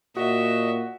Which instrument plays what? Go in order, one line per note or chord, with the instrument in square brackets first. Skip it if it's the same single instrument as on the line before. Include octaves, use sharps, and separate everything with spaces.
[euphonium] A#2 [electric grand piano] F#4 [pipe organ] D#5 [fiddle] E5